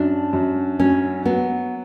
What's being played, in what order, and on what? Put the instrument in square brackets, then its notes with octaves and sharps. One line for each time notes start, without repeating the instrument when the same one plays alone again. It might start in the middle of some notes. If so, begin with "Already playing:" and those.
Already playing: [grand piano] F#2 [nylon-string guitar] D4
[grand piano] F#2
[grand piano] F#3 [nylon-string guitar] C#4
[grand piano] F#3 [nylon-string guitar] B3